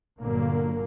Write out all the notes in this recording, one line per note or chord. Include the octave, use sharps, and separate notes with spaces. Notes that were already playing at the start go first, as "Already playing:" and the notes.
G1 A#2 D3 F#3 A#3